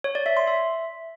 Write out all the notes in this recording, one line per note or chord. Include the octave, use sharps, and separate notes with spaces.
C#5
D5
E5
C6
E5